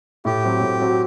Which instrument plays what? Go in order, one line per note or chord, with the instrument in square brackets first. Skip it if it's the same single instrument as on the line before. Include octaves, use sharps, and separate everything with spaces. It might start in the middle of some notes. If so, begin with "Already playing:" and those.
[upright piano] A2 [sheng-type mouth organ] G4
[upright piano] F#3 C4 F#4
A2
F#3 C4 F#4